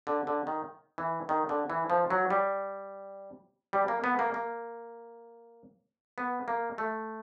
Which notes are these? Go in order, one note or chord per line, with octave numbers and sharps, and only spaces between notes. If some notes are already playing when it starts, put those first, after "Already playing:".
D3
D3
D#3
E3
D#3
D3
E3
F3
F#3
G3
G3
A#3
B3
A#3
A#3
B3
A#3
A3